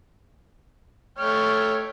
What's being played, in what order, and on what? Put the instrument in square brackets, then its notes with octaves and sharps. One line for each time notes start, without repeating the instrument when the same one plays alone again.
[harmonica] A3 G5 F6 [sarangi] C#5